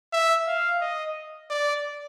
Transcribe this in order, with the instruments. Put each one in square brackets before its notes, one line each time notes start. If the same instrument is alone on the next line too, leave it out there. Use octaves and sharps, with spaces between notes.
[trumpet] E5
F5
D#5
D5